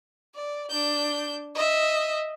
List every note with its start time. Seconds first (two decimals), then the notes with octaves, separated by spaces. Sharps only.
0.35 D5
0.70 D4 G6
1.55 D#5 E5